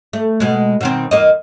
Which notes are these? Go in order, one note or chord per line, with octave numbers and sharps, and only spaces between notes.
A3
B2 G#3
B2 D#3 C4
E2 A#3 D#5